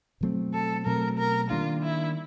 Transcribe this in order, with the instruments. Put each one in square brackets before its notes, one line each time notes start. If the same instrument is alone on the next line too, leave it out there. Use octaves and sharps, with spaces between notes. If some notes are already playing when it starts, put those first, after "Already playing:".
[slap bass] B2 F#3 A3 C4
[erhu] A4
[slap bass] B2 F#3 A3 C4 [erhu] A#4
[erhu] A#4
[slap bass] D#3 G3 A#3 D4 [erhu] F4
[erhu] E4